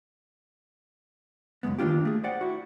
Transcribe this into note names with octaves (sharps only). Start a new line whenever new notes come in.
C#2 F#2 D#3 G#3 B3
D#3 A#3 D4 F4 G4
A3 G#4
C5 D5 F#5 G5
E4 F#4